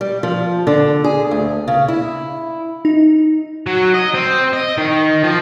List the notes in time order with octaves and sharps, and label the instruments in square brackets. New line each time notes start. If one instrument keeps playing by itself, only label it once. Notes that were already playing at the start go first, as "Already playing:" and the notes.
[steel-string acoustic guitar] G3
F3
D3
G#4
D2
C#3
E4
[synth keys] D#4
[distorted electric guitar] F#3
D#5
C4
D#5
D#3
F3